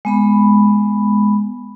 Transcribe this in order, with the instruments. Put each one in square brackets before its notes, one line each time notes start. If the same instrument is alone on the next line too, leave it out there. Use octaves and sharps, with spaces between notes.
[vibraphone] G#3 B3 B5